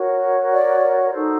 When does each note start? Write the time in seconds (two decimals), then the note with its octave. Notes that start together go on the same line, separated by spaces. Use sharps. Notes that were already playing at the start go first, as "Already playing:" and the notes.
Already playing: F#4 A#4 C#5
0.51 D5
1.11 D#4 F#4 A4 C5